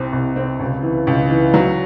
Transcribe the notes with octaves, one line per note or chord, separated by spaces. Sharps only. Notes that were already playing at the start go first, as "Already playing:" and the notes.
Already playing: C2 C4
C2
C4
C#2
E3
C#2
E3
F#3